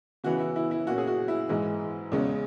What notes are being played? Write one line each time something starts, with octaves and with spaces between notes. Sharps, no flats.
C#3 E3 B3 F#4
E4
E4
E4
A#2 A#3 C#4 F#4
G#4
F#4
E4
G#2 E3 G#3
E2 C#3 G#3 C#4